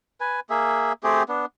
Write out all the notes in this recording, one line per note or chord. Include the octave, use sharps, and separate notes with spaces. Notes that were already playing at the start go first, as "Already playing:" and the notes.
B4 G#5
A#3 G#4 E5
A3 C4 G4 G#4
B3 D4